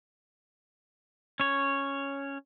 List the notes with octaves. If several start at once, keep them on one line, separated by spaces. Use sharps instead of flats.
C#4 C#5